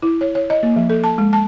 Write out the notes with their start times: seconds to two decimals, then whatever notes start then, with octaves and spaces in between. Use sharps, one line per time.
0.02 E4
0.21 C#5
0.35 C#5
0.50 D#5
0.63 A#3
0.76 F3
0.90 A4
1.04 A5
1.18 G#3
1.33 A5